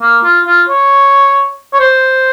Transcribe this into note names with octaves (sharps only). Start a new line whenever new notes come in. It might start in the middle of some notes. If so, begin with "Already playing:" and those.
A#3
F4
F4
C#5
C#5
C5